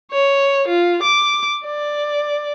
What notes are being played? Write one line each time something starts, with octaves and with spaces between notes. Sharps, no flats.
C#5
F4
D6
D5